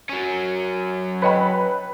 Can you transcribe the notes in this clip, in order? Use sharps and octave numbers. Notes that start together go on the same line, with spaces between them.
F#3 C#4
B4 C#5 D#5 G5 B5